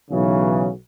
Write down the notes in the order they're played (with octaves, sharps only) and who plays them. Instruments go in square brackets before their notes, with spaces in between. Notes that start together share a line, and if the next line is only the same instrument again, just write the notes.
[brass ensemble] B1 C#3 E3 F#3